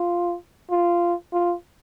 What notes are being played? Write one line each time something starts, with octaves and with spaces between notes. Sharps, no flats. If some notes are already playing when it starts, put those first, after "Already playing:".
Already playing: F4
F4
F4